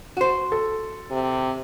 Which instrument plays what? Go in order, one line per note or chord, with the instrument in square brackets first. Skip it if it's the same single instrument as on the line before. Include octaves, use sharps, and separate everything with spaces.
[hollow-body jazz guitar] F#4 C5
[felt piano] A4
[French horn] C3